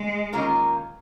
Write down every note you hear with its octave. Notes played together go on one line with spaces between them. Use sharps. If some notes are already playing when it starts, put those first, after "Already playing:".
Already playing: G#3
D#3 A#3 C#4 F4 A#4